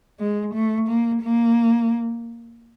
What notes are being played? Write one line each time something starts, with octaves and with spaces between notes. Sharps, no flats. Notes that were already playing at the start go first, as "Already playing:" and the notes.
G#3
A3
A#3
A#3